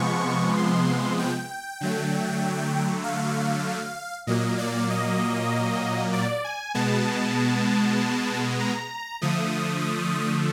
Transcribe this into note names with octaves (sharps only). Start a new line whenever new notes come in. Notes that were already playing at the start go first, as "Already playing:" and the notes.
Already playing: C3 F3 G#3 B3 C#6
C6
G5
D3 F#3 A3
F5
A#2 F#3 A#3 D#5
D5
D#5
D5
G#5
B2 G#3 B3 A5
A#5
D3 F3 A3 D#6